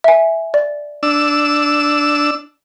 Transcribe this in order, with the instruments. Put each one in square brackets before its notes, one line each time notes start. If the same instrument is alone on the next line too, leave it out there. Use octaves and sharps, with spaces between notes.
[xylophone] E5 G#5
D5
[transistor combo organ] D4 E6